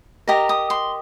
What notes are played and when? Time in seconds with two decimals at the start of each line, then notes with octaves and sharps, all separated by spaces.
0.27 G4 A#4 D#5 A#5
0.49 D#6
0.70 C6